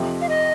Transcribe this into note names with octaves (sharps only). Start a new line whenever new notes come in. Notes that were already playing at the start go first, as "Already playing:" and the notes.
Already playing: F2 C3 F3
F5
D#5